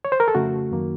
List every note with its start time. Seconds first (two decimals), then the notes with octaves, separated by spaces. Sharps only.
0.05 C#5
0.12 C5
0.20 A#4
0.28 A4
0.35 F2 C#3 A3 F#4
0.72 F#2 D#3 A#3